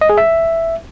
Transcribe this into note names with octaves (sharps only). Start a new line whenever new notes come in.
D#5
G#4
E5